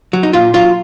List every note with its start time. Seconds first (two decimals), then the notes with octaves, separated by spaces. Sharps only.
0.13 F#3
0.23 D#4
0.33 A#2 F4
0.54 F#3 F4